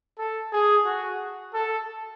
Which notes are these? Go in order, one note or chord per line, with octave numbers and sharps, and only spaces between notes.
A4
G#4
F#4
A4